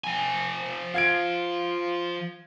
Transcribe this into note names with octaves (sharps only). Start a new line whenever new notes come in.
F3 G#5
F4 F5 G#6 D7